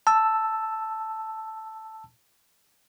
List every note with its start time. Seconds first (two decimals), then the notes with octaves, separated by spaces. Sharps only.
0.07 A5 E6